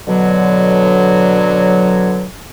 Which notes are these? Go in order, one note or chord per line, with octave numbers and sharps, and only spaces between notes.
B2 D3 F#3